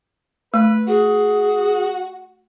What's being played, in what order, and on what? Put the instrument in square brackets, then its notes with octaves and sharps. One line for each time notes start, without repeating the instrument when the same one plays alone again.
[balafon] A3 [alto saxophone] B4
[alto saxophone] F#4 [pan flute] G#4